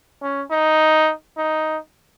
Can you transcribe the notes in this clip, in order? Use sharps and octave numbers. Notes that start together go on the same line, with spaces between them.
C#4
D#4
D#4